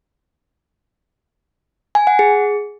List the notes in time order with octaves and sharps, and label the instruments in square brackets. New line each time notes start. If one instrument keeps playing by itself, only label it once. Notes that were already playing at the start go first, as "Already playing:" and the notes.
[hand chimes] G#5
F#5
G#4